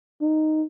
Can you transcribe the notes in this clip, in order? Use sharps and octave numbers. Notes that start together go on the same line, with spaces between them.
D#4